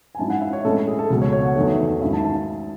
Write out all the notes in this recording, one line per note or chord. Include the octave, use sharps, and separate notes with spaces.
G#5
G#2 F#3 C#4 E4 A5
F#5
E5
C#5
A2 G#3 C#4 E4 A4
G#4
A4
C#2 B2 F#3
C#5
C#5
F#5
E2 D#3 F#3 A3
G#2 D#3 F#3 C#4 E4 E5
A5
A5